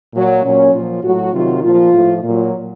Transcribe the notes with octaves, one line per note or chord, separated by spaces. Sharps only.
A#2 F#3
A#2 F#3 C#4
A#2 F4
F3
A2 F#3 F#4
C3 D#3 F#3 F4
A#2 F3 F4
A2 F3
A#2 F#3